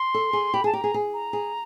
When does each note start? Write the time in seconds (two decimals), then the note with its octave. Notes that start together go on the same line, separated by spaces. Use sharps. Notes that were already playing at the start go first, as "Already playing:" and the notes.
Already playing: C6
0.14 A4
0.33 G#4
0.54 G4 B5
0.64 G#4 A5
0.73 G4 A#5
0.84 G#4
0.94 G#4
1.14 A#5
1.33 G#4